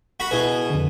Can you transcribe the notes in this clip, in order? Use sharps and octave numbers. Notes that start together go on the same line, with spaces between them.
F#4 B5
B2 E4 G#4 B4
F2 D3